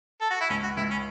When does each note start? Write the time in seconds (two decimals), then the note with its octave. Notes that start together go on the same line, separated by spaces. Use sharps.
0.21 A4
0.30 F#4
0.40 E4
0.49 C#2 C#4
0.63 F#4
0.77 C#2 E4
0.91 C#4